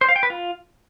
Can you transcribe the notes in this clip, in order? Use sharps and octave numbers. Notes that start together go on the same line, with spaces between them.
C5
F5
G5
B4
F4